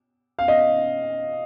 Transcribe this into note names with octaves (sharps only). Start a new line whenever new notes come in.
F5
D#5